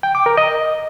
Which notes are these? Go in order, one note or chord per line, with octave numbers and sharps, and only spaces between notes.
G5
D6
A#4
D#5